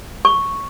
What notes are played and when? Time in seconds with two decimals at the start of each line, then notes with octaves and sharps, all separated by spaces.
0.25 C#6